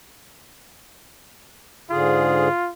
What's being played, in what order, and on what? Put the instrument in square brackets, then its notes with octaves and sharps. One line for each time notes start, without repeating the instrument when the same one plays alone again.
[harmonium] G#2 D3 G#4 [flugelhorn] F4